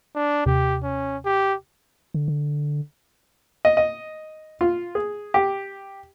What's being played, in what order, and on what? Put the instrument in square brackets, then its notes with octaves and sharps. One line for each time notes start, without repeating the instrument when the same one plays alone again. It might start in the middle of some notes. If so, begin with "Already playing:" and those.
[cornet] D4
[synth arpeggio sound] D#2 C3 [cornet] G4
[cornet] C#4
G4
[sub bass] D3
D3
[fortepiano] D#5
D#5
F4
G#4
G4